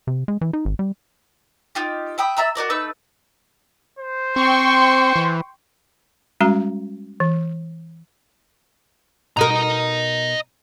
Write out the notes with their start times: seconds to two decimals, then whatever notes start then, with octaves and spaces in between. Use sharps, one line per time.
0.07 C3
0.28 G#3
0.41 E3
0.53 D#4
0.65 G#1
0.79 G3
1.75 D#4 F4 G4
2.18 E5 G5 B5 D#6
2.37 D5 E5 A#5 E6
2.55 F#4 A#4 D5 D#5
2.70 A3 D#4 B4 E6
3.99 C5
4.36 C4 G5 C6 C#6
5.16 E3
6.41 G3 G#3 C#4 F#4 A#5
7.20 E3
9.37 B2 A#4 D#5 A#5